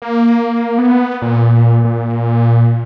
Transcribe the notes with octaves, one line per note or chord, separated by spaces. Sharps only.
A#3
B3
A#2
A#2